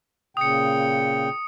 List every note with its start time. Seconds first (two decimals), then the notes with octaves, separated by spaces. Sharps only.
0.37 A#2 C#3 G5 D#6 C#7